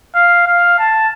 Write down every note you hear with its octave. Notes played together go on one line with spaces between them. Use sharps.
F5
F5
A5